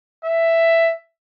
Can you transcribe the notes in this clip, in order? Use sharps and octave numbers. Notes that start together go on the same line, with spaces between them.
E5